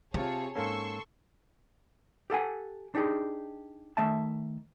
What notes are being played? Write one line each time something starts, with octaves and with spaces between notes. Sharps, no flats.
C3 C4 F4 G#4 C#5 A5
G#2 A#3 C#4 A4 C6 C#6 E6
G4 A4 F#5 G#5
D4 D#4 G4 G#4
D#3 A3 E5 A5